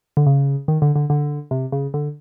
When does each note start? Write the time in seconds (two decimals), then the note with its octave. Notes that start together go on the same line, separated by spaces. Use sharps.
0.17 D3
0.26 C#3
0.68 D#3
0.82 D3
0.96 D3
1.10 D3
1.51 C3
1.72 C#3
1.94 D3